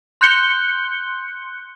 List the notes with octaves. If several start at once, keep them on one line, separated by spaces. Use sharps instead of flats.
C6 F#6 G6 C#7 G7